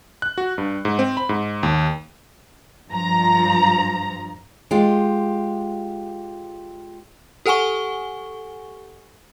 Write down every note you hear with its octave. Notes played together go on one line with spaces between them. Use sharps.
F#6
F#4
G2
G#2
C4
B5
G#2
D#2
G2 F3 A#5
G#3 F4 G4
G4 A4 F#5 G#5 C#6 G7